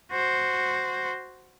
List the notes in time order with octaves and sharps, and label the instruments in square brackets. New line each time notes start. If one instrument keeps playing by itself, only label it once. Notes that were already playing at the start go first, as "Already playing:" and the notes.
[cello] F#4 C5